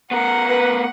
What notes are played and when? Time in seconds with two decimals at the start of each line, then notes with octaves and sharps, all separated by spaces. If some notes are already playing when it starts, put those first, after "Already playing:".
0.11 B3 A#4 F#5
0.49 B4